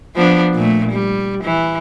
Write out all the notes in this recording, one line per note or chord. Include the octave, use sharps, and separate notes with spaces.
F3 B3 D4
A#2 A3
G3
E3